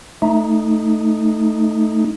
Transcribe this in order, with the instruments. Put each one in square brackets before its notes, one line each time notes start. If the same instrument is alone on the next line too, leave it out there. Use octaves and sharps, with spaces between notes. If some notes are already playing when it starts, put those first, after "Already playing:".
[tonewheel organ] A3 D#4